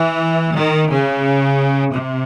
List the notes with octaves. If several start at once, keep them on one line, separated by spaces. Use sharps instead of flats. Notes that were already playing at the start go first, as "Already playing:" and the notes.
Already playing: E3
D#3
C#3
C3